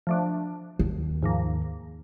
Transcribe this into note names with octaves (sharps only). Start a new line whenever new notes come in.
F3 A3 D4
D#2
G#2 F3 A#3